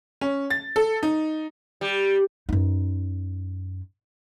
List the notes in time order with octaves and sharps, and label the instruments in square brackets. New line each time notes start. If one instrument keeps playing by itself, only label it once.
[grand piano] C#4
A6
A4
D#4
[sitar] G3
[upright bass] F#2 D#4